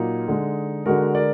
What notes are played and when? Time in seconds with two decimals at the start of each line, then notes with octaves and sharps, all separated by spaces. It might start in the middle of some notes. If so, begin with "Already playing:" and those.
Already playing: A#2 F#3 A#3 D#4
0.28 D3 G#3
0.86 D3 G#3 F#4 A#4
1.15 A#4 D5